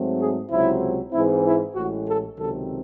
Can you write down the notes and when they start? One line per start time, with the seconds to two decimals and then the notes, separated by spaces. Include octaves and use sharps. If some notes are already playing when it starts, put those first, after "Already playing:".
Already playing: G#2 F#3 A3 C4
0.20 G#4
0.51 C#2 C3 F#3 C4 E4
1.13 G#2 E3 G#3 C4 E4
1.44 E4
1.75 A1 A2 G#3 F#4
2.06 A4
2.37 C#2 C3 D#3 F#3 C4 A4